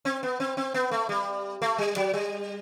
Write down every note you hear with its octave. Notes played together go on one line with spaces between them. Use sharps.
C4
B3
C4
C4
B3
A3
G3
A3
G3
F#3
G3